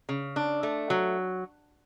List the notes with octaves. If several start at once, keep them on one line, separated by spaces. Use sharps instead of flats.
C#3
D4
A3
F#3